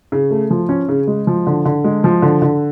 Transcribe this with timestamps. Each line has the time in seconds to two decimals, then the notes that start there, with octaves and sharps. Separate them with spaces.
0.12 C#3
0.31 A3
0.50 F3
0.69 C#4
0.89 C#3
1.07 G#3
1.27 F3
1.47 D3
1.65 D3
1.84 G#3
2.04 F3
2.22 D3
2.42 D3